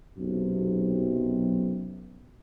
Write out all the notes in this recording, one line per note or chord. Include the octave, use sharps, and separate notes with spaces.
B1 F#2 C3